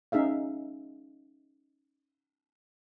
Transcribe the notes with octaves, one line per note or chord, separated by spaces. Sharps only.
C#4 D#4 G#4 E5 F5